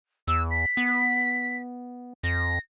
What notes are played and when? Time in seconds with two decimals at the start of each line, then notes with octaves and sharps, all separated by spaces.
0.28 E2 E6
0.50 B6
0.77 B3
2.23 F2 A#6